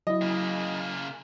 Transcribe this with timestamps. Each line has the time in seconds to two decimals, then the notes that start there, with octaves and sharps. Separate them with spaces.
0.07 F#3 E4 D#5
0.21 C#3 A#3